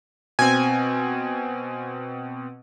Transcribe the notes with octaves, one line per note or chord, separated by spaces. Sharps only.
B2 C4 G#5